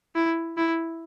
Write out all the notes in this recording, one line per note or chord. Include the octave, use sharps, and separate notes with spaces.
E4
E4